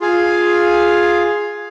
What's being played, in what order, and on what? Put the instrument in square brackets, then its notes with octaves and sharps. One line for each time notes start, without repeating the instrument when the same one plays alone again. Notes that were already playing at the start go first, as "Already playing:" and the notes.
[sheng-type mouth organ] F4 G#4 F5 G#5